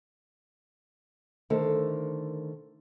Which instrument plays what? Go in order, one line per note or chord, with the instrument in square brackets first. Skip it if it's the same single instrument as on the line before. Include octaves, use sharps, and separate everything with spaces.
[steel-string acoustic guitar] D3 D#3 A3 A4 A#4 C5